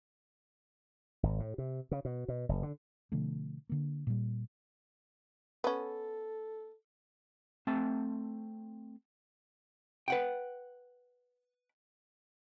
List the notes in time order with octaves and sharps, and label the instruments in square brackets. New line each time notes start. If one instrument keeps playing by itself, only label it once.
[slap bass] G#1
A2
C3
C#3
B2
B2
F#1
D3
[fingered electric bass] B2 D3 F3 A3
D3 A#3
A#2 G3
[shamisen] B3 C#4 [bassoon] A4
[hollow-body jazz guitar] A3 C4 E5 A5
B4 F#5 G5